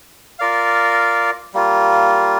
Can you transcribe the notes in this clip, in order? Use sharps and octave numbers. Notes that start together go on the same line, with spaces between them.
F4 A#4 D5 F5
G3 A#3 F4